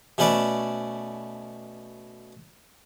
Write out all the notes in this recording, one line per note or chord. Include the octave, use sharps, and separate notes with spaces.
B2 A3 C#4 A4 B4 D5